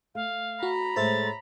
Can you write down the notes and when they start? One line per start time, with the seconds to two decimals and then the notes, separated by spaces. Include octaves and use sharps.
0.15 A3 F5
0.63 F#4 A#5 B5
0.96 A2 G#3 A4 C5 E5 A6